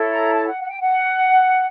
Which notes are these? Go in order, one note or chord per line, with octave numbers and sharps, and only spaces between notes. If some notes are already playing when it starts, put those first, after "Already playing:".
Already playing: E4 A4 C#5
A#5
A5
F#5
F#5
G5
F#5